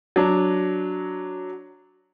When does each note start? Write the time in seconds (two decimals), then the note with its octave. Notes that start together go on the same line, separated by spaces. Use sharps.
0.16 F#3 D4